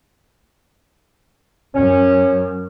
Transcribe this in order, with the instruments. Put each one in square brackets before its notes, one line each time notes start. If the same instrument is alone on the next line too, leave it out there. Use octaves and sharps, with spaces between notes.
[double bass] F#2 [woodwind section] C#4